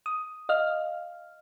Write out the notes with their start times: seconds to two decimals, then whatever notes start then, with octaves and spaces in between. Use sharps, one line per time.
0.06 D#6
0.49 D#5 F5 F6